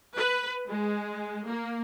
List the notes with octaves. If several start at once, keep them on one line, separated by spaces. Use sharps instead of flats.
B4
G#3
A#3